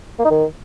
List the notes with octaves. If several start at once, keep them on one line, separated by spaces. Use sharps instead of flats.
A#3
D#4
D#3